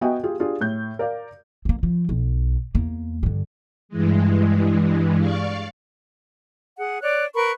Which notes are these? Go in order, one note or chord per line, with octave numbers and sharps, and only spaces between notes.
B3 F#4 D#5 E5 G5 G#5
F4 G4 G#4
D4 F4 G4 G#4
A2 G6
A#4 D5 F5
A#3 C4
F3
B1
E2 A#3
G2 D3
G2 E3 G#3
D5 F5 C#6
G#4 F#5
C#5 D5 F#6
A#4 B4 B5 C#6